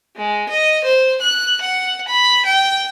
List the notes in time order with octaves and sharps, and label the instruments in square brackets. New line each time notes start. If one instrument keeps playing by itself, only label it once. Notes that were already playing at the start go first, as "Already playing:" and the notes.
[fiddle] G#3
D#5
C5
F#6
F#5
B5
G5